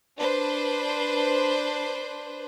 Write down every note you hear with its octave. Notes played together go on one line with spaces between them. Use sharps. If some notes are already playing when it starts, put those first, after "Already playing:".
D4 B4 C5